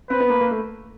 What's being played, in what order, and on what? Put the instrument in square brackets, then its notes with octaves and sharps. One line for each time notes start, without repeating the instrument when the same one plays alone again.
[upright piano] C4 [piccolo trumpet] B4
[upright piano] B3
A#3
A#3
A3